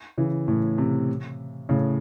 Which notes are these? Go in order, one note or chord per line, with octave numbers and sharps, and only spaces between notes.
C#3 E3
A2
C3
A2 C#3